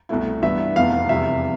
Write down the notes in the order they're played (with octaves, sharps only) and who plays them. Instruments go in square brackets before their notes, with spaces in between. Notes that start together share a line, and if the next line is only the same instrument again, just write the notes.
[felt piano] C2 B2 A3 E4
[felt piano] G2 E3 B3 E4 [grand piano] E5
[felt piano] F1 E2 B2 B3 [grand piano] F5
[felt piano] F1 E2 C3 G3 [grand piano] E5